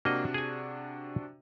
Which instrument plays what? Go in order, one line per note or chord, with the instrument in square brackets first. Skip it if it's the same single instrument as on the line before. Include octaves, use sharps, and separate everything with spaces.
[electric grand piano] C3 D4 F#4 [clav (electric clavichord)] A#3 D#5
[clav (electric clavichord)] G#4 G#5